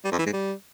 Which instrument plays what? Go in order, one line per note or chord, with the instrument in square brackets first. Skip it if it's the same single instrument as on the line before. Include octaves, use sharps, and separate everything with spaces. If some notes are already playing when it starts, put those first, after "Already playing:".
[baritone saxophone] G3
F2
E3
G#2
G3